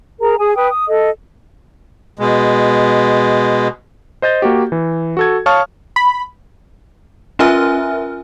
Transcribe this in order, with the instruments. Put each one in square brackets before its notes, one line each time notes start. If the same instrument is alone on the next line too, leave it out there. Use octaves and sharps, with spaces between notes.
[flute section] G#4 A#4 A#5
G#4 G#5 D#6
B4 G5 D#6
D#6
A4 D#5
[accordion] B2 G#3
[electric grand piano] C5 D#5 G6 A6
A#3 F#4 G4
E3
F#4 A4 G#6
C#5 F5 A5 C#6 D#6 F6
[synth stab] B5
[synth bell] C#4 F4 A#4 E5 G#5 F6